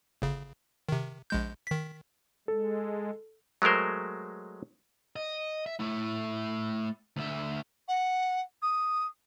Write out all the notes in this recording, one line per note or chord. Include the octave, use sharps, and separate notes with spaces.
G1 C#3
C3 D#3
A#1 G#3 G6
D#3 B6
G#3 A4
F#3 G#3 A3 A#4 C5
D#5
E5
A3 E4
D2 E5
F#5
D#6